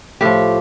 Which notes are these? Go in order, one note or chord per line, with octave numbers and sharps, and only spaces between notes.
A2 F3 G4